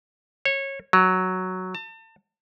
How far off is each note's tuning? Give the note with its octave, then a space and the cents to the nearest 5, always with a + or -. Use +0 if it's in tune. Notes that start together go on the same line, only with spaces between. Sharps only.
C#5 -20
F#3 +0
A5 +35